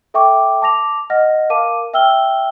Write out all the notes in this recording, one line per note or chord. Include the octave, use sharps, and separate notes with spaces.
A4 E5 G5 C#6 D6
A5 D6 A#6 F7
D#5 F#5 F6 A#6
A#4 F5 A5 D6 D#7
E5 G5 E6 F6 G7